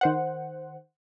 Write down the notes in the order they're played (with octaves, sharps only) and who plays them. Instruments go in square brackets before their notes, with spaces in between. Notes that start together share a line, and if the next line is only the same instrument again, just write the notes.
[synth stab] D#3 C5 F#5